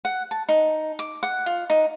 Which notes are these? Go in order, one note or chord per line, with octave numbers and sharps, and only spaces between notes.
F#5
A5
D#4
D6
F#5
F4
D#4